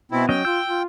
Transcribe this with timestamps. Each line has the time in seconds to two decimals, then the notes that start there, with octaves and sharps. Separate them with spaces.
0.12 B2 B3 C4 E4
0.29 F#3 C#4 D#5 G5
0.45 F4 E6 G6
0.66 F4